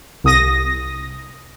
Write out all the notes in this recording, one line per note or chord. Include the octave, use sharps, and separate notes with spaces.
C2 D#6 A#6